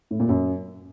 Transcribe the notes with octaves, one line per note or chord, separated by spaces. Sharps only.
A2
A#2
F#2